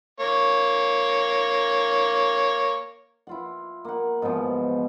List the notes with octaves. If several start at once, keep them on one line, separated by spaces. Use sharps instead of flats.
A#3 C#5
E4 F4 F#5
A#3 F#5
G#2 B2 E3 F3